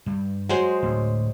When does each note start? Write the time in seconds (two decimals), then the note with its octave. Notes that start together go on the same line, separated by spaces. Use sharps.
0.06 G2 G3
0.49 F#3 G#3 C5
0.83 D2 A2